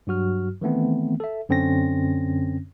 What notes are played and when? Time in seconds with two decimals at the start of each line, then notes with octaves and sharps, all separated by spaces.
0.07 G2 F#3 F#4 F6
0.61 D#3 E3 A3 B3 C4
1.20 A4 E5
1.49 F#2 D3 C4 C#4 A#6